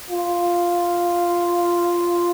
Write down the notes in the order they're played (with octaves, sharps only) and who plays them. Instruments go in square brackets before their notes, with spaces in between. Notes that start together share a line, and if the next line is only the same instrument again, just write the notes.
[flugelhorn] F4